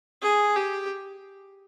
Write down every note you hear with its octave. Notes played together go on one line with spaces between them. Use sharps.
G#4
G4